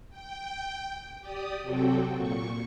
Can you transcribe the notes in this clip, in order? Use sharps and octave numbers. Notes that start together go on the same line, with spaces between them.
G5
G4 D5 D#6
C3 F#3 C4 F#4 A4 G5
A#2 C#6